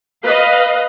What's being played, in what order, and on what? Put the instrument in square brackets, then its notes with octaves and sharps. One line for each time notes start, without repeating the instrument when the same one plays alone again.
[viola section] B4 D#5 F5